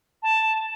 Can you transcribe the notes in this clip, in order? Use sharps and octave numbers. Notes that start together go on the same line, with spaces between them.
A5